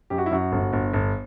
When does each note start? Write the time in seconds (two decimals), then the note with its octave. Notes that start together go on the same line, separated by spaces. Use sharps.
0.10 F#2 G4
0.18 F#4
0.26 E4
0.31 F#2 F#4
0.52 G1
0.73 G1
0.93 G1